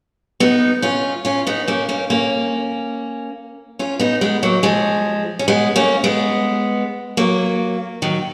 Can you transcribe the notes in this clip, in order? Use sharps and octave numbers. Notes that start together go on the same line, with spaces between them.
B3 D#4
C#4 F4
C#4 F4
B3 D#4
A#3 C#4
A#3 C#4
A#3 C#4
C#4 F4
B3 D#4
G#3 B3
F#3 A#3
F3 G#3
C#4
G#3 B3
A#3 C#4
G#3 B3
F#3 A#3
D#3 F#3